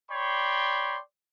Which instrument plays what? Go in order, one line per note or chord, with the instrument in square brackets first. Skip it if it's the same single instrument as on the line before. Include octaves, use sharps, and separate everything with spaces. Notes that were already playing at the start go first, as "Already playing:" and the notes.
[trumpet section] C#5 D5 G5 B5 C6